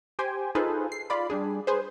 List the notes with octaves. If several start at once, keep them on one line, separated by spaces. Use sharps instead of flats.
G4 C5 G5 G#5
D#4 F4 G#4 A4 B4 C5
C7
F4 D5 B5
G3 D4 G#4
G#4 B4 C5